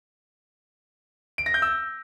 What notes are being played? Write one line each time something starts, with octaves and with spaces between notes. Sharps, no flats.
D7
A#6
G6
E6